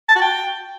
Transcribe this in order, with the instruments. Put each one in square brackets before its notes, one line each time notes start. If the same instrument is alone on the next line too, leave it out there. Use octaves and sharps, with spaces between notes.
[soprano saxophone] A5
F#4
G5